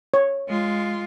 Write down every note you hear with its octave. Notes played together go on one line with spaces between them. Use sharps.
C#5
G#3 F4